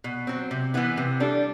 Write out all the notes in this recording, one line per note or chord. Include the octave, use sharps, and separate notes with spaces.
B2
F#3 C4
C3
E3 B3 E4
C3
G3 D4 A4